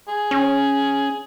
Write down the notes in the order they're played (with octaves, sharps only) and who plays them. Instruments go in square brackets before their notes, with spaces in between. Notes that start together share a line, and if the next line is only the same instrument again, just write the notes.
[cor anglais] G#4
[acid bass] C#4